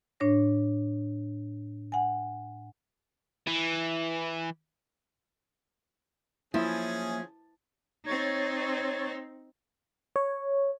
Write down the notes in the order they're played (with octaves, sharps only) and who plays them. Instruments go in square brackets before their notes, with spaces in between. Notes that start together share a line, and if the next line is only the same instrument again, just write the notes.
[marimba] A2 D4 C#5 A#6
F#5 G#5
[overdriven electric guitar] E3
[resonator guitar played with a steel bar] F3 [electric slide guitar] F#3 A#3 E5 [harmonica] C#4 G#4 [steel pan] E4
[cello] C4 D#4 [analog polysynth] C#5 G#6 A6
[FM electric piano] C#5